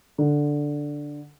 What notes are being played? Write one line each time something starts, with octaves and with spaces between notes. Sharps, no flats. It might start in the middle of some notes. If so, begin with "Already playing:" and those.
D3